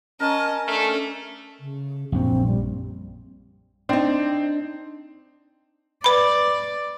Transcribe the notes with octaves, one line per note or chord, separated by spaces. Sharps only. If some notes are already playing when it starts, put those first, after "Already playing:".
C#4 A#4 D#5 A5
A3 D4 A4
C#3
A#1 F#2 C4
G3
C4 D4 D#4
B4 D5 B5